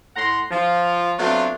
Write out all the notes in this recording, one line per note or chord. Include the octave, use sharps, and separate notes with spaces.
A2 F#5 A#5 C6
F3 F4
F#3 A3 B3 C4 D4 F4